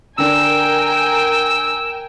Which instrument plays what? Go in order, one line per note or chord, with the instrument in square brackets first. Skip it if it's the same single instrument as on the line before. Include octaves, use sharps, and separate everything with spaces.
[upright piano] D3 D4 [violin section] A#4 G5 G#5 [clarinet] E6